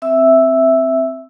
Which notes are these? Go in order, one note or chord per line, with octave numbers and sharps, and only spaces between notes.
C4 E5 E6